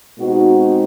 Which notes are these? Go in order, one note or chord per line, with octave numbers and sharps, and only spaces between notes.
B2 G#3 C4 D#4 F#4